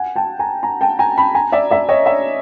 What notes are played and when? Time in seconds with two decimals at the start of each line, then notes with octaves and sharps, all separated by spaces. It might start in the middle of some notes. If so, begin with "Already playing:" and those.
Already playing: F#5 G#5
0.16 G5 A5
0.39 G#5 A#5
0.63 G#5 A#5
0.81 G5 A5
0.99 G#5 A#5
1.17 A5 B5
1.35 G#5 A#5
1.52 D5 E5
1.70 D5 E5
1.89 C#5 D#5
2.06 D5 E5